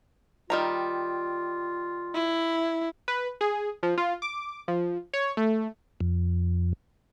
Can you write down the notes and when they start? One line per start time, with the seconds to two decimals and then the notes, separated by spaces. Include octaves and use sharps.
0.50 D#3 G3 F4 A#5
2.15 E4
3.08 B4
3.41 G#4
3.83 F3
3.98 F4
4.22 D6
4.68 F3
5.13 C#5
5.37 A3
6.00 F2